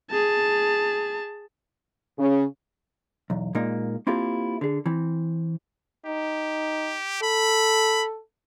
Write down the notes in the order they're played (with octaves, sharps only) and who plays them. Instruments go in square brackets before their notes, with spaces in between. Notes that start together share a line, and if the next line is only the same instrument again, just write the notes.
[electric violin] G#4 A5
[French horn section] C#3
[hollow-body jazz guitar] B1 E2
A#2 G#3 A#3 D#4
A#3 C4 E4 F4 G4 A4
D3 G#4
E3 C4
[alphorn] D#4 [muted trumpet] G4
[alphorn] A4 [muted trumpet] B5